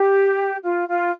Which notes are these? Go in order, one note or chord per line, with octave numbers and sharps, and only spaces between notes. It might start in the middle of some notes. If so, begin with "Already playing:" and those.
Already playing: G4
F4
F4